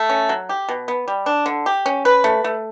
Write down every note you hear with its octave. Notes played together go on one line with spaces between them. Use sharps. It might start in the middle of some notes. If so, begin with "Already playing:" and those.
Already playing: A3
C#4
F#3
G4
B2
B3
G3
D4
D3
G4
C#4
B4
A3
A3